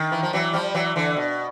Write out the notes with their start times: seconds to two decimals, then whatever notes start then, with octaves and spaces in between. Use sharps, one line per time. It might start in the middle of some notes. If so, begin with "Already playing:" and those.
Already playing: D#3
0.12 E3
0.23 F3
0.33 E3 F#3
0.53 F3 G3
0.75 E3 F#3
0.96 D3 E3
1.17 B2